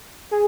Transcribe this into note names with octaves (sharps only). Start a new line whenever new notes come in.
G#4